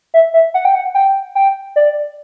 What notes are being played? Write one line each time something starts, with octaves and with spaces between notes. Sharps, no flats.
E5
E5
F#5
G5
F#5
G5
G5
D5